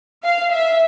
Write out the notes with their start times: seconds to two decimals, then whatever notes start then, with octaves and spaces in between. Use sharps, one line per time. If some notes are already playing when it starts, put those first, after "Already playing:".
0.24 F5
0.53 E5